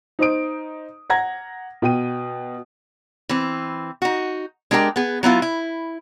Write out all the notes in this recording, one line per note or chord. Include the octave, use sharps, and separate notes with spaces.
D#4 C5 D#6 D7
F#5 A#5 G#6 A#6
B2 G5 D#7
E3 C4
D#4 F#4
G#3 D4 G4 A#4 G5
B3 G#4
F#3 B3 E4 F4
E4